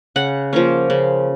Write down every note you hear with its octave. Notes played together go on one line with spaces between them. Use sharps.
C#3 F#5
F3 A#3 C#4
C#3